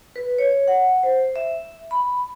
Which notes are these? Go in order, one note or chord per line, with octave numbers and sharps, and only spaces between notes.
B4
C#5
F#5
C5
E5
B5